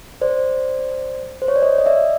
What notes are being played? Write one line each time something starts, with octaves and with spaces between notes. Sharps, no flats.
C5 D5
C5
C#5
D5
C#5 D#5
D#5
D5 E5